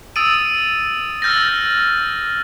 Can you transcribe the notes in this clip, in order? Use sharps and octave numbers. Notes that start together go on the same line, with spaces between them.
D#6 E6 A6 D7 D#7
E6 F6 G6 A6 A#6